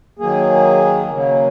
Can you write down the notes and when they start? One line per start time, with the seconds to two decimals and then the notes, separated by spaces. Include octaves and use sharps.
0.19 D#3 F#3 A#3 G#4
1.11 C#3 F#3 A#3